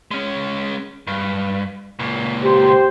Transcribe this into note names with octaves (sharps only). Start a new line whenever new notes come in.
G#3 C#4
G2
C#2 A#2
G4 C5